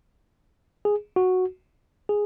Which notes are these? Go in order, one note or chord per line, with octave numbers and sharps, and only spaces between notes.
G#4
F#4
G#4